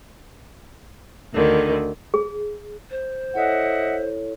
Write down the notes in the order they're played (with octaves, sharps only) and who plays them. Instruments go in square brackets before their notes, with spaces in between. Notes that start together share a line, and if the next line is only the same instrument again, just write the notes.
[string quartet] D2 D3 D#3
[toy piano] G#4
[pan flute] C5
[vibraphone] E4 A4 C#5 [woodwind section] D#5 E5 F#5